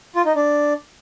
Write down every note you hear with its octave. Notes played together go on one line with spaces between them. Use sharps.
F4
D#4
D4